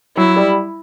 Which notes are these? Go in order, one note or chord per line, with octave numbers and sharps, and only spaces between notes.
F#3 E4
G3